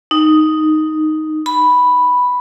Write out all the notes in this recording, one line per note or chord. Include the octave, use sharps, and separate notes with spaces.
D#4
B5